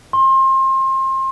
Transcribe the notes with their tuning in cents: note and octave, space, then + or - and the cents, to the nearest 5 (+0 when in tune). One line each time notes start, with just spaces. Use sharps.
C6 +30